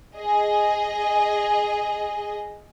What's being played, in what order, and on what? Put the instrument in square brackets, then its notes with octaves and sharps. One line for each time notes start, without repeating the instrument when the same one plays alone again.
[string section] G#4 D#5